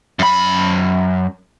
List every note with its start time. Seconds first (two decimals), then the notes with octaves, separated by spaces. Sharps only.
0.19 F#2 B5